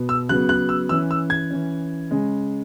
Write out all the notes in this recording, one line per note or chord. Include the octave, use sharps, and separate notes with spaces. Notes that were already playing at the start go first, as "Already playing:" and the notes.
Already playing: B2 B3
E6
C#3 F#3 B3 F#6
F#6
E6
E3 C#4 E6
E6
G#6
E3 C#4
C#3 G#3 C#4